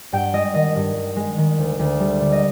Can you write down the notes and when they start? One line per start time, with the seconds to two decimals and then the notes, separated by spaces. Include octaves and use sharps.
0.13 G2 G5
0.33 G#3 D#5
0.54 D#3 D#5
0.76 G2
0.96 G2
1.16 G#3
1.38 D#3
1.58 D2
1.79 D2
2.00 G3
2.21 D3
2.32 D#5